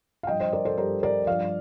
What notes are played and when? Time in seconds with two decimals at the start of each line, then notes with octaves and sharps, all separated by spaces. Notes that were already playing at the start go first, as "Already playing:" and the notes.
0.23 F5
0.27 G2 F3 D#5 G5
0.40 C5 D#5
0.52 A#4 D5
0.65 A4 C5
0.77 G2 F3 G4 A#4
1.03 A#4 D5
1.27 G2 F3 D5 F5